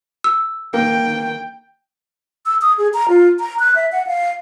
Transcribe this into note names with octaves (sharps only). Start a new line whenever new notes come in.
E6
A#3 G5
E6
D#6
G#4
A#5
F4
A#5
F#6
E5
F#5
F5